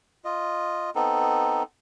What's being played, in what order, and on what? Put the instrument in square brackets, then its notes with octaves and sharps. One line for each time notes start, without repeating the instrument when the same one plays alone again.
[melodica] F4 D#5
B3 C4 D#4 A4